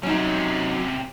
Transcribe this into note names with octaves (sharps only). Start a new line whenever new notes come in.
C3 F#3 C#4 D#4